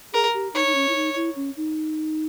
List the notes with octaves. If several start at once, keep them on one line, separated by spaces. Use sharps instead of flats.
G#4 A#4
G4
D#4 C#5
D#4
C#4
E4
D#4
E4
C#4
D#4